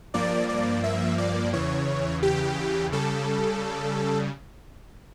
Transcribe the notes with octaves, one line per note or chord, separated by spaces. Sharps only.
G2 F3 A#3 D5
D5
E5
D5
E2 C#3 E3 C#5
G4
C#3 G3 A4